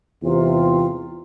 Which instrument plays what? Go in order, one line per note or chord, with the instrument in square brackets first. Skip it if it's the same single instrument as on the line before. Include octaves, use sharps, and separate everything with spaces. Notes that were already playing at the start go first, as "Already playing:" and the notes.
[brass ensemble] E2 G#2 C3 [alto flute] F4